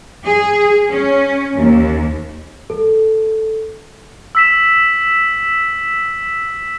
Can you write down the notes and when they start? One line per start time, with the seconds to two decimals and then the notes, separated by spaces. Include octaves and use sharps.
0.24 G#4
0.89 C#4
1.56 D#2
2.70 A4
4.35 E6 B6 E7